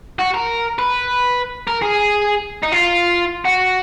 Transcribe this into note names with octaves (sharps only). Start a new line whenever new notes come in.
F#4
A#4
B4
A#4
G#4
D#4
F4
F#4